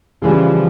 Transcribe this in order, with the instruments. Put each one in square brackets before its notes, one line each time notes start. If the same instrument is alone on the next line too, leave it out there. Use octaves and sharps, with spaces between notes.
[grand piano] C#3 E3 G3 [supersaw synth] F3